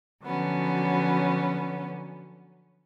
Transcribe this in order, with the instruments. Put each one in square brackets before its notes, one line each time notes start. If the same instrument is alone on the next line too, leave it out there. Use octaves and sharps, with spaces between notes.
[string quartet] D3 F3 F#3 B3 C#4